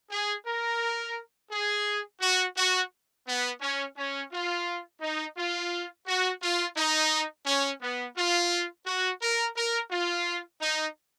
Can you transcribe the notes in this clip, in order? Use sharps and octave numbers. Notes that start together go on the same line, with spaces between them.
G#4
A#4
G#4
F#4
F#4
B3
C#4
C#4
F4
D#4
F4
F#4
F4
D#4
C#4
B3
F4
F#4
A#4
A#4
F4
D#4